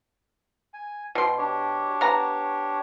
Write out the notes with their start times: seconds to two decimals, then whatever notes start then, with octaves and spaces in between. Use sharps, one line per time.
0.74 G#5
1.15 B2 G5 C6
1.38 D4 G4 C#5
2.01 B3 A#5